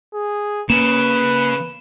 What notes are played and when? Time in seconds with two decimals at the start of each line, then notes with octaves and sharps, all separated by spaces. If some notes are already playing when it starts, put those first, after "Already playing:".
0.14 G#4
0.70 C#3 A#3 B4 E7